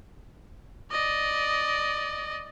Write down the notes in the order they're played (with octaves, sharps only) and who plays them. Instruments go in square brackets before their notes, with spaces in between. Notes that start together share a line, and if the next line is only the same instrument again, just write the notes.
[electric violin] D5 D#5